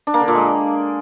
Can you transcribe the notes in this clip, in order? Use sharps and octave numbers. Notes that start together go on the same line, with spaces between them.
D4
A#3
D3
A#2
G#3